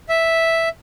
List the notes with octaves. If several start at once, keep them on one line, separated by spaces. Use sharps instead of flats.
E5